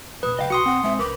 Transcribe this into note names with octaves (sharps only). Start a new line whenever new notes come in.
D#1 A#2 B4 D#6
C#3 F#3 D#5 F5 G5
B1 F#4 C6 D#6 C#7
C4 F#5
G#3 C4 E5
C2 C#4 A#4 B4 D6